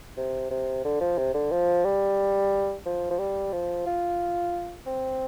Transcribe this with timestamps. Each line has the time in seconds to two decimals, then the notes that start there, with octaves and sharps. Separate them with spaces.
0.17 C3
0.50 C3
0.84 D3
1.00 F3
1.18 C3
1.34 D3
1.51 F3
1.84 G3
2.86 F3
3.10 F3
3.18 G3
3.52 F3
3.86 F4
4.86 C4